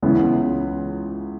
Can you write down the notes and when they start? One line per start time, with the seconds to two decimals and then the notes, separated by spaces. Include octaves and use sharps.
0.02 C#2 C#3 E3 B3 E4